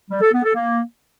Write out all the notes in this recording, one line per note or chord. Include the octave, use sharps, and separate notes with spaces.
G3
A4
B3
A4
A#3